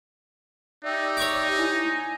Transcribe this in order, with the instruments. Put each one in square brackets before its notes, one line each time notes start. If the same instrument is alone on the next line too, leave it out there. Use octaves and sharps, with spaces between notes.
[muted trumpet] D#4 [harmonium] G4 D5 E5
[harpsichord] C#5 C#6 D6
[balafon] E4 [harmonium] G#5